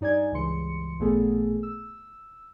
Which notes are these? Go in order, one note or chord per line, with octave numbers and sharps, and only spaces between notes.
G2 D#4 D5 G#5 G#6
C#2 G2 C#3 E3 C6 C#7
A1 A#2 A3 B3 G#4 A4
E6